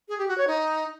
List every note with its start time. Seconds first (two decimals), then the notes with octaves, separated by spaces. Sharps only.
0.09 G#4
0.18 G4
0.28 F#4
0.38 C#5
0.47 D#4